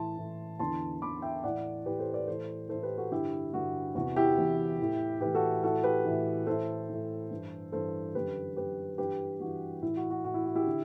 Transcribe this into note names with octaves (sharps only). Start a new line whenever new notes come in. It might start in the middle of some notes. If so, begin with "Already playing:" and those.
Already playing: A2 E3 A5 C6
A2 E3
E2 D3 A5 C6
E2 D3 B5 D6
E5 G5
A2 E3 D5 F#5
A2 E3 G4 B4
A4 C5
B4 D5
A2 E3 A4 C5
A2 E3 A4 C5
G4 B4
F#4 A4
G2 D3 E4 G4
G2 D3 F#4
E2 C3 E3 F#4
E4 G4
E2 C3 E3
A2 E3
A2 E3 G4 B4
F#4 A4
A2 E3 F#4 A4
G4 B4
A2 E3
A2 E3 A4 C5
A2 E3
G2 E3
G2 E3 A4 C5
F#2 D3 G4 B4
F#2 D3 G4 B4
G2 E3 G4 B4
G2 E3 F#4
A2 E3 E4
F#4
F#4
A2 E3 F#4
E4
F#4
E4 G4
D3